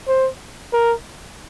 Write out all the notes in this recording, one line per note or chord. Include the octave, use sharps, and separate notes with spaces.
C5
A#4